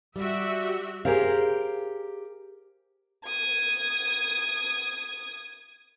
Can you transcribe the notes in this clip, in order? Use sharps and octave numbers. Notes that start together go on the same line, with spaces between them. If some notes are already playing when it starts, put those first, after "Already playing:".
G3 F#4 G4 E5
G4 G#4 A#4 C5 F5
D#6 G#6